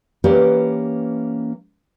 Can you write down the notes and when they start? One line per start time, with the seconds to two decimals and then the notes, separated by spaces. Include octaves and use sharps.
0.24 E3 A#3 C#4 G4 B4 D5